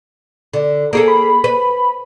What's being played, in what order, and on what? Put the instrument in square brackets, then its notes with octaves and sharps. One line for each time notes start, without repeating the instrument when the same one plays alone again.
[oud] D3
A#3 G#4 A4
[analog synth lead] B5
[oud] B4